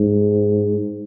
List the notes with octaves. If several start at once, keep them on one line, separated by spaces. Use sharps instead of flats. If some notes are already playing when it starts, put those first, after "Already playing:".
Already playing: G#2